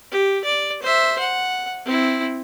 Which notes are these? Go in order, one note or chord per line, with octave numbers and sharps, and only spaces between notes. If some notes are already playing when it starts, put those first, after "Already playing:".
G4
D5
C5 E5
F#5
C4 E4